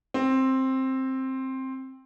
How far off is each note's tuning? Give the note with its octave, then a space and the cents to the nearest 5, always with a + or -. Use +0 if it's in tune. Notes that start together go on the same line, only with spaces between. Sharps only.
C4 +10